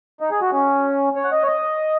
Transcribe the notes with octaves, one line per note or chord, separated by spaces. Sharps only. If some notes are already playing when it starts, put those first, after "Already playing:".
D#4
G#4
F#4
C#4
C#5
F#5
D#5
C#5
D#5